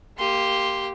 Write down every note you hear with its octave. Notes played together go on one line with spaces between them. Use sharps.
A#3 G4 C6